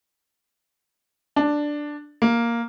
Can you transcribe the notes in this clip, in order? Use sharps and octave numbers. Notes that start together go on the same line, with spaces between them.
D4
A#3